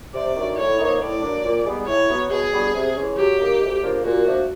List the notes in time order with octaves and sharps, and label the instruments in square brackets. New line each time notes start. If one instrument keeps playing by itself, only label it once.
[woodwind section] C3 [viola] D5
[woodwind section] D#3 F#3 A3 D4
[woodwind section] A2 [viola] C#5
[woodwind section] F3 A#3 D#4
[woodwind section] A2 [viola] D5
[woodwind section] F#3 A#3 D4
A#2
G3 B3 D#4 G#4
[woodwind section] A2 [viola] C#5
[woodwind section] F#3 B3
[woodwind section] B2 [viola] G#4
[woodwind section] G3 B3 D4 F#4
C3
E3 G#3 C#4
[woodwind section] F#3 [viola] G4
[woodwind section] A#3 D#4
D2
C#3 F3 A#3 D4
[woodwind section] A#2 [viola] F#4
[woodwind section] F3 A3 D4